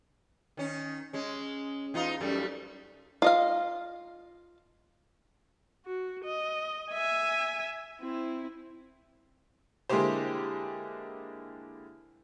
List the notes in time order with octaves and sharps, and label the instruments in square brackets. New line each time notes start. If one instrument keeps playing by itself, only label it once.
[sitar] D#3 C#4
G#3 C#4
E2 D#4 F4
F#2 G3 A3
[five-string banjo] F4 D#5 F5
[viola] F#4
D#5
E5 G#5
C4 E4
[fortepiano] D3 G#3 A#3 E4 G4 C5